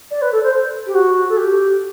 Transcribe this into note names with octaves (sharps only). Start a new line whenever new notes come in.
D5
B4
A4
C5
G4
F#4
A4
G4